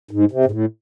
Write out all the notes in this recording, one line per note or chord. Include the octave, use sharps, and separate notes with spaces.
G#2
C3
G#2
A2